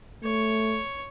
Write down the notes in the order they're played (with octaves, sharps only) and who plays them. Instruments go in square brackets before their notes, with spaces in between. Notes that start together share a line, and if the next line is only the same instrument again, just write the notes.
[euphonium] A3 [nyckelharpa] C#5